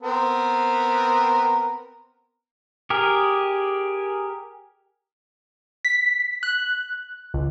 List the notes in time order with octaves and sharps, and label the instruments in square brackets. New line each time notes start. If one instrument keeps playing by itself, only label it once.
[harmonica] B3 C4 A#4
[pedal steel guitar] G4 G#4 A#4
[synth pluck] B6
F#6
C#2